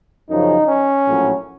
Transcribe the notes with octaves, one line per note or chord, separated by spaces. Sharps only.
F#2 C#3 F3 D#4
C#4
A#1 A2 F#3